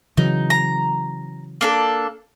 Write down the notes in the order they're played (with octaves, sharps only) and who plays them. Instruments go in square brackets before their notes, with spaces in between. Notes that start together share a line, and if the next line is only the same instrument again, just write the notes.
[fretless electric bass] C#3 E3 F#3 [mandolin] D#4
[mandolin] A#5
A#3 D4 A4